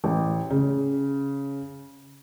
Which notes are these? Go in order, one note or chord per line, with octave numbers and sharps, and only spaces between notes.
A1
C#3